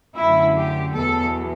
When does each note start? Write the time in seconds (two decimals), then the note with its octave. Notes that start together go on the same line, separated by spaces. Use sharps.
0.18 F#2 D3 A3 E4
0.57 G4
0.95 E2 B2 F#3 B3 A4